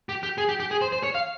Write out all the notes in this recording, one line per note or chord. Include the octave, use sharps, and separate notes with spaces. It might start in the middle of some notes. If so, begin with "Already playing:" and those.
G4
G4
G#4
G4
G4
G#4
C5
C5
C#5
F5